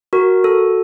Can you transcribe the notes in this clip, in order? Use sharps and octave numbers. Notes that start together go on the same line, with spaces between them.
F#4 A#4
A4